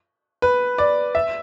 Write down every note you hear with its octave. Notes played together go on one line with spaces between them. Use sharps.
B4
D5
E5